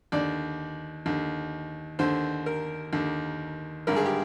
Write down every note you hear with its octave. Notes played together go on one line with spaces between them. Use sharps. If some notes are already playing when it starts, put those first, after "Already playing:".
D#2 D3 D5
D#2 D3
D#2 D3 C5
A#4
D#2 D3
G#1 G2 D3 A#4
G#4
G4